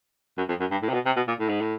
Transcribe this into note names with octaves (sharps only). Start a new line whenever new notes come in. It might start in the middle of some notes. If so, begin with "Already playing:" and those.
F#2
F2
F#2
G2
A2
C3
B2
C3
B2
A#2
A2
G#2
A2